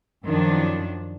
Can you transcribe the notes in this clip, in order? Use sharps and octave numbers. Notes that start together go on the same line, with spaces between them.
F#2 D#3 F3 D4